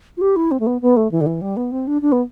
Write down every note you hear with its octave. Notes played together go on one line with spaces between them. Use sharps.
F4
G4
E4
C4
A3
B3
B3
A3
E3
D3
E3
G3
B3
C4
D4
D4
B3